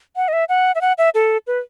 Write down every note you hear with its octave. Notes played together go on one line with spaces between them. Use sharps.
F#5
D#5
E5
F#5
E5
F#5
E5
A4
B4